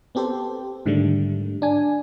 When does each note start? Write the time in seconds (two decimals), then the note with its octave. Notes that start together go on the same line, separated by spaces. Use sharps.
0.15 B3 C4 G4 A4 C5
0.86 G#2 D3 D#3 G3 A3
1.62 D4 G#5